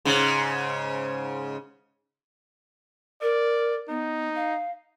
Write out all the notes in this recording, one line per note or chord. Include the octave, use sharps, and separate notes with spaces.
G#2 C#3
A#4 D5
B3 D#4
F5